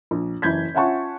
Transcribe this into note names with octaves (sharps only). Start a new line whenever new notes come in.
A#1
F#1 E3 G6 G#6 B6
C#4 F4 E5 F#5 A5 C#6